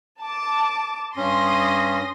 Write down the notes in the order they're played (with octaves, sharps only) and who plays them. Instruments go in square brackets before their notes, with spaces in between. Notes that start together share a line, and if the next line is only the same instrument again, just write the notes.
[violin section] A5 D6
[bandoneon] G2 C#4 [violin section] C6 D#6 A#6